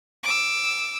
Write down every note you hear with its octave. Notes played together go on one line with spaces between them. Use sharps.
D6 E6